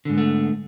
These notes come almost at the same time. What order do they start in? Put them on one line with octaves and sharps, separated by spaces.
D3 G#2 B3 A3